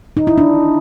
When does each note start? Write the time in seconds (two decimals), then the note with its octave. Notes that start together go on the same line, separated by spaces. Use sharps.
0.17 D#4
0.27 E4
0.38 D4